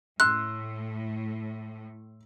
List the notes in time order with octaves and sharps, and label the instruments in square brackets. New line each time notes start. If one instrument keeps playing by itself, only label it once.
[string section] A2 [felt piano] C6 E6 [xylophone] F#6